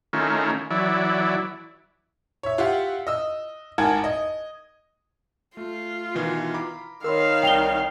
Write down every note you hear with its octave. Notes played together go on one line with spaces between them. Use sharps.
D#3 A3 C#4 E4 F4 A#4
E3 F#3 E4 D5
C#5 E5
F4 G4 E5 F#5
D#5 E6
G#1 A#4 F#5 G#5 A5 G#6
D#5
A3 F4
B2 D#3 E3
A#5 B5 D6
D#3 A#4 C#5 F5 B5 C6 E6
C2 D5 G5 A#5 F7 G7